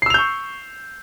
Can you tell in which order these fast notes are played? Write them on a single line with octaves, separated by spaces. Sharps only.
C7 E6 F7 G6 C#6